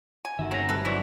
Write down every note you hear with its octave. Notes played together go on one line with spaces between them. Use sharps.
G#5
G1 D#3 A3 F#4 E5
G#3 C4 C#4 A#5
C3 G3 A4 B4
F#2 B2 E3 E4 F#4 C5 D5